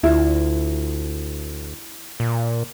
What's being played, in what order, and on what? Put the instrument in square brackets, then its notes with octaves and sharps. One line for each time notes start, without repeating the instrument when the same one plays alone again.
[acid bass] D2 [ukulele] E4 F4
[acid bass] A#2